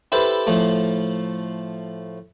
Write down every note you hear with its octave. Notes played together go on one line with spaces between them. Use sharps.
E4 G4 A4 B4 C5
A2 F3 A3